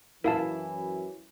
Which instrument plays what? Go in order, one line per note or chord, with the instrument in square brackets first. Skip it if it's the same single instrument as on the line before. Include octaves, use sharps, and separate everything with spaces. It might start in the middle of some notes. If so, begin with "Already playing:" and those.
[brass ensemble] F#2 E3 [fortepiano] E4 [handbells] A#4 F5 A5